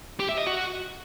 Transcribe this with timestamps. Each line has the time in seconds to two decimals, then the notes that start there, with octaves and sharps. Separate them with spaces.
0.20 G4
0.29 E5
0.38 D#5
0.47 F#4